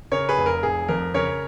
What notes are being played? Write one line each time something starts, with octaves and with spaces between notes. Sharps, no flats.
C#3 A#4 C#5
G#4 B4
F1
A#4
F1 G#4
F2 A#4
C#3 A#4 C#5